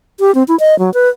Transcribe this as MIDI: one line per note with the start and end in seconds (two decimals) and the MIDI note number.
0.20 0.34 67
0.35 0.43 60
0.48 0.58 64
0.60 0.78 75
0.79 0.93 54
0.94 1.09 71